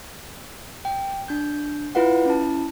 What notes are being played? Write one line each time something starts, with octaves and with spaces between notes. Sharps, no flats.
G5
D4 G6
E4 F4 B4 F5 F#5
C#4 E4 A5